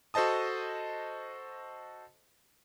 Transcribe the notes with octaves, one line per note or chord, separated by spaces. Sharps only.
F#4 A4 C5 D#5 A5 D#6